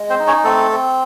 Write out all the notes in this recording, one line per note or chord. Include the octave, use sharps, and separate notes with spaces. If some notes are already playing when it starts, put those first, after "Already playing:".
Already playing: G#3
C4 C5
D#4
C#4 C#5
A3 C4 A4
C4